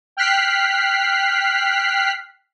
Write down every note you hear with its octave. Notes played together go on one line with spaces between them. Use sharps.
G5 F6 F#6 B6 C7